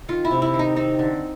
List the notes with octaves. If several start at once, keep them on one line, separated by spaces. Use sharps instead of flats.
D#3 F4
E4
C3
E4
D#3
D#4
C4 D#4
D3